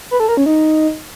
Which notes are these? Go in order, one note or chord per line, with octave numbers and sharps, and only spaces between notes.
B4
A4
A#4
C#4
D#4